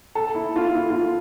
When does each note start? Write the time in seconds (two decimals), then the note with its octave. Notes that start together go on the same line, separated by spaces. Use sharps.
0.15 A4
0.34 E4
0.56 F4
0.75 F4
0.90 F4